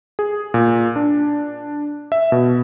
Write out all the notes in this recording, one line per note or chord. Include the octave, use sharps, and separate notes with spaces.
G#4
A#2
D4
E5
B2